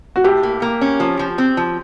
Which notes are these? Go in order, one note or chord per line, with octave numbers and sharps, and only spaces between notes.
F#4
A2 G4
A#3
A#3
C#4
F3
F3
C4
F3